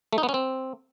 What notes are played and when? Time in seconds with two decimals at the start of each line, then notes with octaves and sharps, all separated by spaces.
0.13 A3
0.18 D#4
0.23 B3
0.29 C#4
0.34 C4